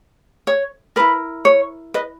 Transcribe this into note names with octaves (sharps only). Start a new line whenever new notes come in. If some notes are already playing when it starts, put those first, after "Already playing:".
C#5
E4 A#4 B4
C#5
B4 D#5